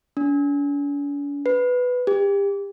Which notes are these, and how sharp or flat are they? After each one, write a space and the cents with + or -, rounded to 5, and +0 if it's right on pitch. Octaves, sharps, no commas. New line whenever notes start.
D4 -45
B4 +5
G4 +30